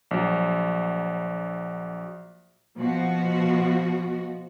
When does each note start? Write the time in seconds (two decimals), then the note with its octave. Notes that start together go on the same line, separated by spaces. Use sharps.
0.11 A#1 F#3
2.75 B2 F3 F#4